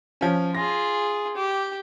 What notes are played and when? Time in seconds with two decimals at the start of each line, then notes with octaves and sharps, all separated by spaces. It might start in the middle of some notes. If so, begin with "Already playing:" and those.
0.21 F3 C#4
0.55 F4 G#4 A#6
1.36 G4